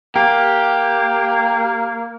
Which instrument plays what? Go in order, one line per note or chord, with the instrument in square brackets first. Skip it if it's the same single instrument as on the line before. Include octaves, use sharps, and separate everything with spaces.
[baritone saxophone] A#3 [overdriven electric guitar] G4